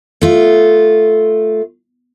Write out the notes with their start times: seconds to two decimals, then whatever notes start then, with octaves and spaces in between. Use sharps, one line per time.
0.22 A3 F4